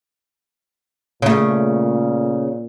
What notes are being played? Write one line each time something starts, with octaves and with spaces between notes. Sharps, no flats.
A#2 C#3 A3